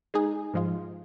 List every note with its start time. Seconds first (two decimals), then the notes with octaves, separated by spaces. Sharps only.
0.14 G#3 D#4 G#4
0.54 G#2 F3 G#3 F4